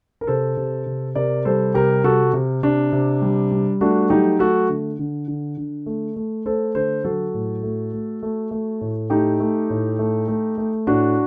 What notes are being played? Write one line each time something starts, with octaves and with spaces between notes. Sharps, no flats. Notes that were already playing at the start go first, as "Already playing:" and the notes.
A#4
C3 A4 C5
C3
C3
C3 A#4 D5
G3 A4 C5
C3 G4 A#4
C3 F#4 A4
C3
C3 D4
C3
G3
G3
A3 D4 F#4
F#3 D#4 G4
A3 F#4 A4
D3
D3
D3
D3
A3
A3
A3 A4 C5
D3 A4 C5
F#3 F#4 A4
A2
A3
A3
A3
A3
A2
A3 D#4 G4
A3
A2
A3
A3
A3
A2 D4 F#4